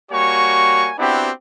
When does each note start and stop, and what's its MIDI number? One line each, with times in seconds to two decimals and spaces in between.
0.11 0.92 55
0.11 0.92 58
0.11 0.92 66
0.11 0.92 73
0.11 0.92 80
0.11 0.92 85
0.98 1.30 59
0.98 1.30 60
0.98 1.30 62
0.98 1.30 64
0.98 1.30 66
0.98 1.30 67